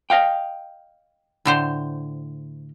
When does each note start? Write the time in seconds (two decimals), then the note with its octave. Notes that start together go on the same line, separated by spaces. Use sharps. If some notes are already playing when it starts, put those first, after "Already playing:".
0.10 D#5 F5 G5
1.45 A2 D3 C5